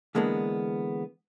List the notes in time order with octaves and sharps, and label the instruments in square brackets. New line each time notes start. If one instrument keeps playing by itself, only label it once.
[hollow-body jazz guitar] D3 E3 G#3 A#3 B3 D4